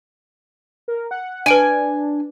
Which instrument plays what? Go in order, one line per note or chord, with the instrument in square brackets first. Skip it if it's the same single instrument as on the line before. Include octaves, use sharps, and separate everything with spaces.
[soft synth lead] A#4
F#5
[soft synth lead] D4 [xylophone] B4 D7 D#7 [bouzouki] G#5